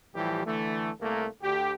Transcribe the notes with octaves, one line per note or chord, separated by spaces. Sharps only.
A2 E3 F3 G3 G4
D3 E3 A3
C2 A3 A#3
D2 G4